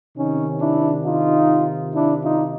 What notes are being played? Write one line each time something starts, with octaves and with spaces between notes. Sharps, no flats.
C3 D#3 C#4 D#4
D4 E4
D#4 F4
D4 E4
D#4 F4